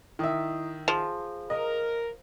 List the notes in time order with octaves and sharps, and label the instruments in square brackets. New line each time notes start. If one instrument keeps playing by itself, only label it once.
[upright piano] D#3 E5 [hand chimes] E4 D#6
[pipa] F3 [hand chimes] G#4
[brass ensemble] A#4 [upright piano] D#5